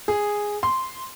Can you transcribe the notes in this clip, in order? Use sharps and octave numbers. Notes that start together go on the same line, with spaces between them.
G#4
C6